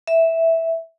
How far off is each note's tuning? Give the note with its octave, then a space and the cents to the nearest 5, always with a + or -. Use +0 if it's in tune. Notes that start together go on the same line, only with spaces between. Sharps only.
E5 -5